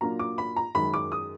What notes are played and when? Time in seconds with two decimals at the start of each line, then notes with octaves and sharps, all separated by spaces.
0.01 A#2 F#3 A#3 D4 F4 A#5
0.19 D6
0.38 B5
0.56 A#5
0.75 F#2 D#3 G#3 B5
0.94 D6
1.12 D#6